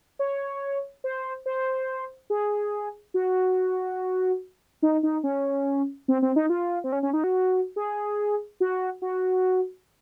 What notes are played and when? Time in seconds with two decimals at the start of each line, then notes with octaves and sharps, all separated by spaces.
0.19 C#5
1.04 C5
1.46 C5
2.30 G#4
3.14 F#4
4.82 D#4
5.03 D#4
5.24 C#4
6.08 C4
6.22 C4
6.36 D#4
6.50 F4
6.84 C4
6.92 C#4
7.03 C#4
7.13 D#4
7.24 F#4
7.76 G#4
8.60 F#4
9.02 F#4